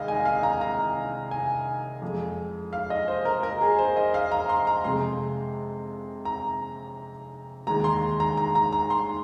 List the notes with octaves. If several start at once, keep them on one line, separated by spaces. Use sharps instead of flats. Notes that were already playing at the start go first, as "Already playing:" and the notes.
Already playing: C2 C3 D#3 G#3 D#5 F5
G#5
F5
A#5
A#5
G#5
F2 F3 G#3
F5
D#5
C5
A#4
A#4
G#4
C5
D#5
F5
A#5
C6
A#5
F2 C3 G#3 C6
A#5
D#2 D#3 G#3 A#5
C6
A#5
A#5
A#5
A#5
C6